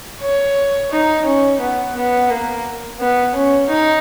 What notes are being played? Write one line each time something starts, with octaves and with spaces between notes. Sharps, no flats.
C#5
D#4
C#4
B3
B3
A#3
B3
C#4
D#4